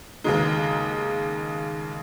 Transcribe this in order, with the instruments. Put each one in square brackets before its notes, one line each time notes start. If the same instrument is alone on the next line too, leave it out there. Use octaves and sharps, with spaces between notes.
[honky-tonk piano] D#2 C#3 G#3 D#4